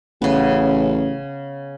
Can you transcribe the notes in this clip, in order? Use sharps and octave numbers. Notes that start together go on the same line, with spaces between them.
A1 C#3 B3